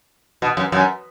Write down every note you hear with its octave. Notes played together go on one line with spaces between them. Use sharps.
B2
F#2
F#2